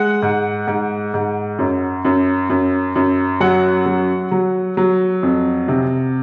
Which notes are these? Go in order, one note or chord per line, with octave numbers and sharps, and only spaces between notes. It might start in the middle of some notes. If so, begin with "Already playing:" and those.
Already playing: G#3 F#5
G#2
G#2
G#2
F#2
F#2
F#2
F#2
F#3 F#5
F#3
F#3
F#3
F2
C3